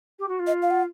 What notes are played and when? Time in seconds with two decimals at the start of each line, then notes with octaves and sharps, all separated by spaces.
0.19 G4
0.28 F#4
0.39 F4
0.47 D#5
0.62 F5
0.71 F#5